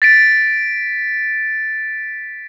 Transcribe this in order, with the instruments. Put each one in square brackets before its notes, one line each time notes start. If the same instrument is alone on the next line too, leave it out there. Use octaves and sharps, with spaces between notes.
[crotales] A6 B6 D7